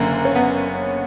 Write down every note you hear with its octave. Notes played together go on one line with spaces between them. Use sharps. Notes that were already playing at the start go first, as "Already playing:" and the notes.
Already playing: F#1 F#2 D3 A#3
C#4
B3